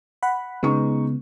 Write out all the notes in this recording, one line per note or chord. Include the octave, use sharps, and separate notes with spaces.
F#5 B5
C#3 G#3 B3 D#4 C#6